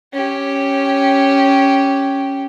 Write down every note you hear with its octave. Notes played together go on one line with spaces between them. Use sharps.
C#4 G4